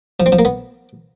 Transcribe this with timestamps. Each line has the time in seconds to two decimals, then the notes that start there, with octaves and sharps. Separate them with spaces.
0.20 F3
0.26 C4
0.32 F3
0.39 A#3
0.45 B3